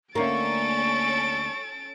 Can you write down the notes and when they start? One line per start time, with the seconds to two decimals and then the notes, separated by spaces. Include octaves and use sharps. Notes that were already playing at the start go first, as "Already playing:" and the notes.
0.15 D2 A#3 C#4 A4 C#6 A6 D7